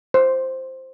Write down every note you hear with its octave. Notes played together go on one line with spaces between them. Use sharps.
C5